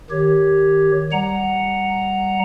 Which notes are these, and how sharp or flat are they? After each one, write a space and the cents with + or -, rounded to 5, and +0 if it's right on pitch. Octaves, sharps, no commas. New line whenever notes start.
D#3 +0 G4 +0 C#5 +0
G3 +0 F#5 +0 A#5 +0